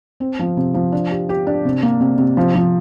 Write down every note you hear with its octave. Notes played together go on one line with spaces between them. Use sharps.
C4
F3
C3
F3
D4
G4
G4
D4
C3
A#3
C3
C3
F3
F3